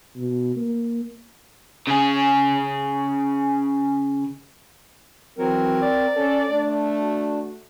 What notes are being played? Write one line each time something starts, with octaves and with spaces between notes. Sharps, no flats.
B2
A#3
C#3 G#4
E3 F#3 C4 A#4
D5
C#4 A4
A3 D4
F#4